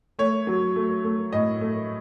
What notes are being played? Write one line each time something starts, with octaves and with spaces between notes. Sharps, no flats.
A3 C#5
F#3
A3
A3
A2 D#5
A3